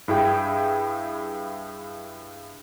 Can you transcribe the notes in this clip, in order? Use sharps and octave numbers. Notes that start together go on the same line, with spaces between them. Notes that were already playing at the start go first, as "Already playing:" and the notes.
G2 E4 G#4 G5